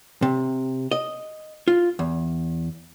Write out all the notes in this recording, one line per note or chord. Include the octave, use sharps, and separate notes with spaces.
C3
D#5
F4
E2